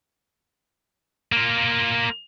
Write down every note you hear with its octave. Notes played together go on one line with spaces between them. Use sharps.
A#3 F4